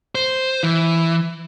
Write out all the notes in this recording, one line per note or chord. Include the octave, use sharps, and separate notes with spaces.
C5
E3